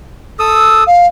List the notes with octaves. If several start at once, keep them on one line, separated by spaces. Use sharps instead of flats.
A4 D#6 E6
F5